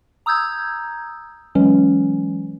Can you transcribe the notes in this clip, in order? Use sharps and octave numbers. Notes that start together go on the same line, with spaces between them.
A#5 D#6 E6 G6 G#6
E3 F#3 G#3 C#4